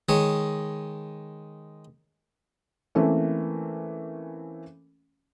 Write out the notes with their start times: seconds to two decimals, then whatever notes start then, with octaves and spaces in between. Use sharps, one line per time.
0.09 D#3 G#3 C#5
2.95 E3 A3 A#3 C4 C#4